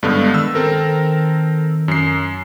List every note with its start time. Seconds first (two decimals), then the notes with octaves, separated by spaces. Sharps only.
0.03 G2 D3 G#3 B3
0.34 D#3 E6
0.55 C4 A4 A#4
1.88 F#2 C7